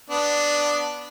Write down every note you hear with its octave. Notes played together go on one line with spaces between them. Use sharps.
B3 D4